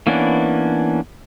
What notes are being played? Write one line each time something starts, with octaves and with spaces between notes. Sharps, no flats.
E3 A#3 B3 C#4 D4